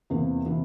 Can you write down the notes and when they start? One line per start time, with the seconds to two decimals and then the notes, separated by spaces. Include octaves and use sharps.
0.10 E2 C3 E3 A#3
0.46 C3 E3